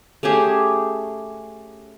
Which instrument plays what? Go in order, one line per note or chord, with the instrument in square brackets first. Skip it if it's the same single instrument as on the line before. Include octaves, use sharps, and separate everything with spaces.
[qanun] A3 C#4 G4 G#4